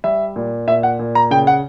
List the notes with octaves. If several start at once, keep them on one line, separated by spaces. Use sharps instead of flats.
G3 E5
A#2
A#2 E5
F#5
A#2
A#5
C#3 G5
F#5